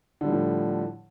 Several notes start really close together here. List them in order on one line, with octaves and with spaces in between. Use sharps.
D3 G3 F3 A2